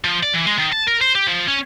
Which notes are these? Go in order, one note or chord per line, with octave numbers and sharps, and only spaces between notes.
F3
D5
E3
G#3
D#3
A5
A#4
C5
G4
F3
C#4